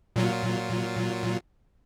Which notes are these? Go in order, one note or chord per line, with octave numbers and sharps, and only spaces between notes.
A#2 F#3 F4